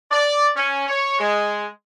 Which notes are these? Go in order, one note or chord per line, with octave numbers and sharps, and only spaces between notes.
D5
C#4
C#5
G#3